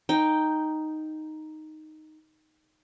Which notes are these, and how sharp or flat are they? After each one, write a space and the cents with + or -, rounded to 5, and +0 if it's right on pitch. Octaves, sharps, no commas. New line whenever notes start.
D#4 +0 G5 +0